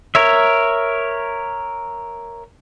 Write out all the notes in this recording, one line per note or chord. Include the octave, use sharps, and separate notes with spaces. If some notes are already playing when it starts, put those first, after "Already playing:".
A#4 C#5 E5